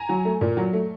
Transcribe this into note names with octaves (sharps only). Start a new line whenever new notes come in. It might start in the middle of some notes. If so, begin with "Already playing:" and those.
Already playing: G#5 A#5
F#3
A3
A#2
F#3
A3